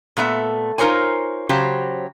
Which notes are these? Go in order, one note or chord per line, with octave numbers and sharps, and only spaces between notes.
A#2 A3 B3 E5
D#4 F4 A#4 C5 C#5 G#5
C#3 F#3 G4 C5